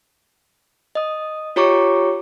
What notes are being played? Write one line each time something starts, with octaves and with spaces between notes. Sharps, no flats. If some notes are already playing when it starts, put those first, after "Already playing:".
D#5 D#6
F4 G4 C#5 A#5 C#6 D6